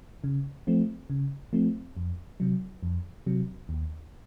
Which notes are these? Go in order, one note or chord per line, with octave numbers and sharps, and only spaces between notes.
C#3
F3 A3 C4
C#3
F3 A3 C4
F2
C3 F#3
F2
C3 F#3
D#2